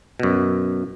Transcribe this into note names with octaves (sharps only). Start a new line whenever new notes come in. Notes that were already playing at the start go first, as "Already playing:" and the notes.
F#2 B2